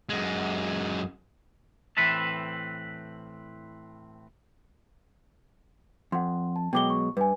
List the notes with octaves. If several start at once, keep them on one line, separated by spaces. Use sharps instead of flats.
F#2 G#3
A2 E3 C4 B4 E5 A5
F2 F#5 C6
A5
B2 F#3 G#3 G5 D6 G7
C#6
G2 B4 G#5